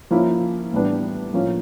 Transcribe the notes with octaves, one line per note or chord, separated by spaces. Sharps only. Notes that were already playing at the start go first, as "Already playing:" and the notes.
F3 A#3 C#4 E4
A2 E3 G3 B3 D4
A2 F3 A#3 C#4